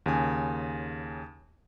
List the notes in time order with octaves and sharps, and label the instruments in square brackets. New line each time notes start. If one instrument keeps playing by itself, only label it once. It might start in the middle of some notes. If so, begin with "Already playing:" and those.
[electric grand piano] D#2 C#3 G#5